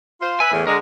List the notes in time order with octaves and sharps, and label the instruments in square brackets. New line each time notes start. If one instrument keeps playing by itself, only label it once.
[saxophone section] F4 C5
[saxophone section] B4 E5 [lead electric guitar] G#5
[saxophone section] E2 A2
[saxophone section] D3 G#3 [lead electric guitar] A#4